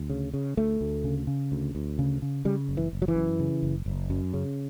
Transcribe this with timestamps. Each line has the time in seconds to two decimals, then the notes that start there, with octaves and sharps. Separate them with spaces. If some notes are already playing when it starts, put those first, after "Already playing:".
Already playing: D2
0.10 C#3
0.34 C#3
0.57 D2 A3
0.81 D2
1.04 C#3
1.27 C#3
1.52 D2
1.75 D2
1.99 C#3
2.22 C#3
2.45 C#3 G3
2.69 F#1
2.77 E3
2.93 F#1
3.02 F#3
3.08 E3
3.15 F#2
3.40 C#3
3.63 F#1
3.86 F#1
4.10 F#2
4.33 C#3